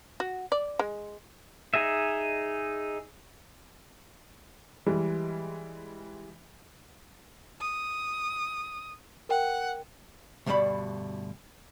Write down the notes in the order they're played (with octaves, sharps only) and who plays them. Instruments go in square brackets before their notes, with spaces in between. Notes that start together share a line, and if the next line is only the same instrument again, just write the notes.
[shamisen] F#4
D5
G#3
[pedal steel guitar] D#4 G#4 D#5 E5
[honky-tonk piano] E3 G3 G#3
[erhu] D#6
[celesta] A#4 G5 [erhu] F#5
[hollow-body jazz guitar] D2 G2 B2 G3 D5 B5